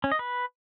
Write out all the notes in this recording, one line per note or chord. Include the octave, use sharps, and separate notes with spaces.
C#4
D#5
B4